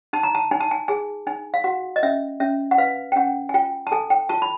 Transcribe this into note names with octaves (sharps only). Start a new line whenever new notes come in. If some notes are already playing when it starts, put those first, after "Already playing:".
D#4 A5
A#5
A5
D#4 G#5
A5
G#5
G#4 G#5
D#4 G#5
F5
F#4 F#5
D#5
C#4 E5
C#4 E5
F#5
B4 F5
G5
C#4 F#5
G#5
F4 G5
A5
A4 G#5
G5
F4 A5
B5